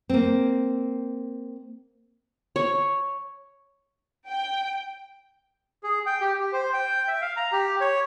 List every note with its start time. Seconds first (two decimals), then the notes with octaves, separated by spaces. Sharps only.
0.09 A#3 C4
2.56 C#5
4.28 G5
5.83 G#4
6.06 G5
6.21 G4
6.40 G4
6.53 C5
6.74 G5
7.08 E5
7.22 F5
7.37 A#5
7.52 G4
7.81 C#5